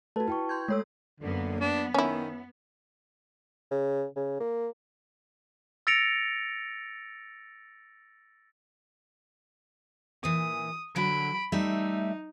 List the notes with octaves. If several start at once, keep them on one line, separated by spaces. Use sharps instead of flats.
A3 F#4 A4 B4 A5
E4 B4 G5 C#6
C6 G6 G#6
G#3 A3 A4 C#5 E6
F#2 D3 A#3 B3
B3 D4
D#3 C#4 E4
C#3
C#3
A#3
E6 A6 A#6 C#7 D7 F7
A#2 E3 D#6
D3 F#3 B5 D7
G3 A3 D#4 E5